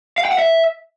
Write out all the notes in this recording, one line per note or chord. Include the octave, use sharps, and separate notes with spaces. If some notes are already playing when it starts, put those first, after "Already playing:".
F5
G5
F#5
E5